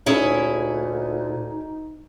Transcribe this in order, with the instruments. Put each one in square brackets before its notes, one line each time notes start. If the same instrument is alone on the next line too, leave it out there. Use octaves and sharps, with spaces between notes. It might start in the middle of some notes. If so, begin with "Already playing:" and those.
[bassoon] D2 [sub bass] A#2 [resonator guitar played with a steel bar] C#4 E4 G#4 [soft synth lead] D#4